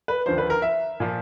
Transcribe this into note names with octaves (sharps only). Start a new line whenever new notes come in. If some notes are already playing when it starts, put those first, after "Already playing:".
B4
D#2 D3 F3 C5
B4
A#4
E5
A#2 F3